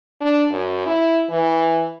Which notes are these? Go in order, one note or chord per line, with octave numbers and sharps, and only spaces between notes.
D4
F#2
E4
E3